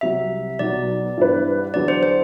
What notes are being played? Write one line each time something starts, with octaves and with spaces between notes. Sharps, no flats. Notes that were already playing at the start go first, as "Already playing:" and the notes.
C2 C3 F#3 E5
B1 B2 F#3 D5
G2 E3 B3 E4 B4
E2 D3 F#3 D5
C5
C5